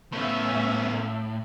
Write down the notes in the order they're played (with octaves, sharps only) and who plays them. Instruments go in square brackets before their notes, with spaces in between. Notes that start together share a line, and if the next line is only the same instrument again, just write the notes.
[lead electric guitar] A2 [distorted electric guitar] A3 B3 [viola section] C#4 E5 F5